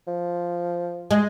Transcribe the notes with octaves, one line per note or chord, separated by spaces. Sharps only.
F3
G#3